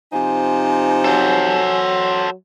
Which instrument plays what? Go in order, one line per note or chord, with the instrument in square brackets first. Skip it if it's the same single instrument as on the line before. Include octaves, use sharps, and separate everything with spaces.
[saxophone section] C3 F3 D#4 [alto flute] G#5
[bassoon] F#3 [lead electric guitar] A4 C5